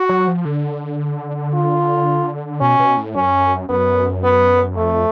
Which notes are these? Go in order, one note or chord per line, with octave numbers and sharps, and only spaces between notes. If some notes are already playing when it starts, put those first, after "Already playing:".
Already playing: F#4
F#3
F3
D3
F4
B2 C#4
B2
A2
F#2 C#4
F#2 B3
B3
F2 A3